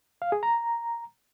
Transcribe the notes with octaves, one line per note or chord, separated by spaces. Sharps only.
F5
G#4
A#5